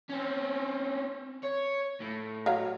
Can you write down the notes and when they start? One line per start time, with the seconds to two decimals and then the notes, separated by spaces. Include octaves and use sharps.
0.10 C4 C#4
1.44 C#5
2.00 A2
2.46 F#3 C#5 F5